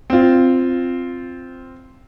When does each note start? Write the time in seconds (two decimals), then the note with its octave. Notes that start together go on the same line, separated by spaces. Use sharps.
0.10 C4 F4